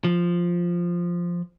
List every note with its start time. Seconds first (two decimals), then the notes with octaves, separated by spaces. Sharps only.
0.04 F3